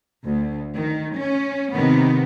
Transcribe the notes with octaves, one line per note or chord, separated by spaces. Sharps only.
D2
D#3
C#4
C3 D#3 B3